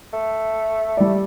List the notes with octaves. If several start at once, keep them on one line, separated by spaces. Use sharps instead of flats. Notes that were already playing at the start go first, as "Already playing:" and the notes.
A3
G3 D5